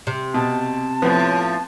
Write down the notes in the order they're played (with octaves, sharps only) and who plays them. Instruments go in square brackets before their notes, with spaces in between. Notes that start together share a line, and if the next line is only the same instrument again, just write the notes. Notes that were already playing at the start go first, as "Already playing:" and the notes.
[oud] C3
[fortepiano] B2 [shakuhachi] A5
[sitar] A2 F3 [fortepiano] B3